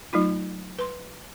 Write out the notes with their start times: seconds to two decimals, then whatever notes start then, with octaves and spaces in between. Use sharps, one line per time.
0.13 F#3 A3 D#4 F4
0.79 B4 C6